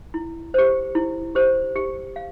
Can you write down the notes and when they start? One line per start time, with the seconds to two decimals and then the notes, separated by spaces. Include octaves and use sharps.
0.14 E4
0.54 G4 C5
0.95 E4
1.35 G4 C5
1.76 G4
2.16 F5